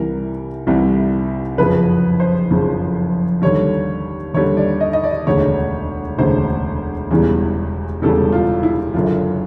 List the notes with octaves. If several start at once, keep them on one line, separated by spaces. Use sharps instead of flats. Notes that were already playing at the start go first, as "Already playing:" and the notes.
Already playing: C2 C3 E3 G3 A#4
C2 C3 E3 G3
F#1 F2 C#3 F3 B4
C5
F#1 F2 C#3 F3
D#2 D3 G3 C#5
D#2 D3 G3 C#5
D5
D#5
D#5
D5
E1 D2 C#3 C#5
E1 D2 C#3 C5
E1 E2 C#3 E3 G3
E1 E2 C#3 E3 G3 A4
F4
E4
F#1 F#2 D3 F4